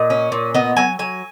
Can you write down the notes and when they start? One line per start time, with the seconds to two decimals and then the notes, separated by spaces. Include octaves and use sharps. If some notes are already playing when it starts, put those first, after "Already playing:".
Already playing: A#2 D#5
0.10 C#4
0.32 A#2
0.54 B3 D#5
0.77 F#3 G#5
0.99 F#3 G#5